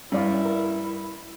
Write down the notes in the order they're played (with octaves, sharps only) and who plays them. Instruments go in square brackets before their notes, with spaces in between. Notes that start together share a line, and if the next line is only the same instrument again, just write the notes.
[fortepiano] G2 [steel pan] C#4 D5 F5 [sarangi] E4
[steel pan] A#4